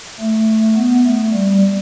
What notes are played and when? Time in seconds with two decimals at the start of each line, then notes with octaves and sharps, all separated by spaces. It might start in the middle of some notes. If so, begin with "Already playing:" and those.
0.20 A3
0.77 B3
1.05 A3
1.33 G3